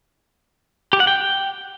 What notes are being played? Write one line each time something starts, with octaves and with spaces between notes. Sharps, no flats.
G4
F#5
G5